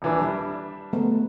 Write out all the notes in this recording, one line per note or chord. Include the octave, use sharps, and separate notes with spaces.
D#1 E3 D4
G3 D4 E5
G#3 A3 B3